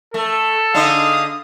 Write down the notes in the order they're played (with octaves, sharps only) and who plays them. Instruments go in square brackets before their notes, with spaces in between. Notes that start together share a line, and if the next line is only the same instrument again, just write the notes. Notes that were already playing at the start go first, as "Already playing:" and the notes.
[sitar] A3 [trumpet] A4
[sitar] D3 D#4 [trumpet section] G#4 F5 D#6